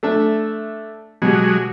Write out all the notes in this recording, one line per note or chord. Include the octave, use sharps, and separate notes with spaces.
A3 D4 E5
B2 F#3 G#3 G4